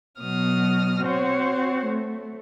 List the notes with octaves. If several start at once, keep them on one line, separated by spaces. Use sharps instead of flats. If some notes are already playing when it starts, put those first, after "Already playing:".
B2 F#3 B3 D#6 F6
C4 F#4 C5 C#5 F#5
A3